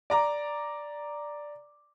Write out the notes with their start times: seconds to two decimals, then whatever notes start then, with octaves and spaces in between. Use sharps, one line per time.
0.10 D5 A#5 D6